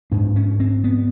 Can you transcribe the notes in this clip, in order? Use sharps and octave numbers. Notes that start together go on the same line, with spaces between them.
G#2 D4
C#4
C4
B3